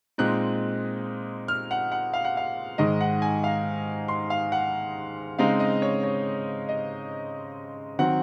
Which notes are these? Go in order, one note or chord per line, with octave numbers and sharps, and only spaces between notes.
A#2 G#3 C4 D#4 F#6
F6
F#5
F#5
F5
F#5
F5
G#2 D#3 G#3 D#5
F#5
G#5
F5
C6
F5
F#5
C#3 G#3 C4 D#4 F5
D#5
C#5
C#5
D#5
D#3 F#3 C4 F#5